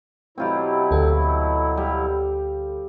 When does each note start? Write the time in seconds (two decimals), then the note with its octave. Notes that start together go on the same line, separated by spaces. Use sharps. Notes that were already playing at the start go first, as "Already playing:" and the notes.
0.38 B2 F#3 C4 E4 F4 G4
0.91 D2 A4
1.77 G3